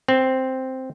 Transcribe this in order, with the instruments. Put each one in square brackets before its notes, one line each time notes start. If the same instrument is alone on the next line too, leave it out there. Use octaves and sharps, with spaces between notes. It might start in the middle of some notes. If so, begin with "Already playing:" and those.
[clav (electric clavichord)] C4